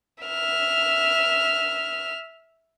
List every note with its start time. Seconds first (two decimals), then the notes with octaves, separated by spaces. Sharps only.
0.23 E5 F6